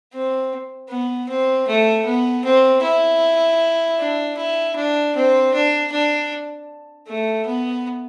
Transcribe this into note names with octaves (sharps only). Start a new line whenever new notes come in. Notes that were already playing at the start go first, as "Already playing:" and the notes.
C4
B3
C4
A3
B3
C4
E4
D4
E4
D4
C4
D4
D4
A3
B3